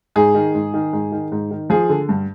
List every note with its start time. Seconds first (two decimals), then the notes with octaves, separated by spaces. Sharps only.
0.16 G#2 G#4
0.35 D#3
0.55 G#2
0.74 D#3
0.93 G#2
1.12 D#3
1.32 G#2
1.51 D#3
1.70 F3 G#4
1.89 D3
2.09 G2